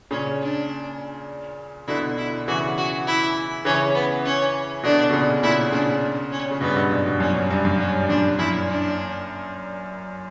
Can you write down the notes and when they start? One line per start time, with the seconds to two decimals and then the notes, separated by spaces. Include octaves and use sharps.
0.11 A#2 C#3 C#4
0.41 D4
1.88 B2 D3 E4
2.17 E4
2.48 C#3 E3 F#4
2.77 F#4
3.07 E4
3.65 C#3 E3 C#4
3.95 B3
4.25 C#4
4.83 B2 D3 D4
5.10 B2
5.13 A#2 C#3
5.43 A#2 C#3 E4
5.72 A#2 C#3 D4
6.32 C#4
6.51 C#3
6.61 G2 B2 B3
6.76 G2 B2
6.91 F#2 A#2
7.05 G2 B2
7.20 F#2 A#2 C#4
7.35 G2
7.51 G2
7.65 F#2
7.80 G2 C#4
8.03 G2
8.09 F#2 A#2 D4
8.39 F#2 A#2 E4
8.68 D4